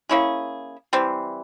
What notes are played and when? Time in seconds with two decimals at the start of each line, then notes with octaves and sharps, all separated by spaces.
0.09 A#3 C#4 E4 G#4
0.93 E3 G3 C4